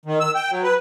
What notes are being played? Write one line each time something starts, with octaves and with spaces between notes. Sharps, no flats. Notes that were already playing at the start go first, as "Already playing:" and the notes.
D#3
E6
G5
F#3
B4